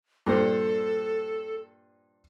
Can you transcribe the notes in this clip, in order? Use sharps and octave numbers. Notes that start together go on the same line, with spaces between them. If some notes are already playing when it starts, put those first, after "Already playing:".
G2 A#2 A4 C5